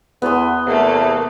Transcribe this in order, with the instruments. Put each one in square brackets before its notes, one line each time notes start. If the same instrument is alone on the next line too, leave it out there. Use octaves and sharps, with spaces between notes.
[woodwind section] E2 [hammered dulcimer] B3 C6
[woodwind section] E2 C3 [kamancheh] A3 A#3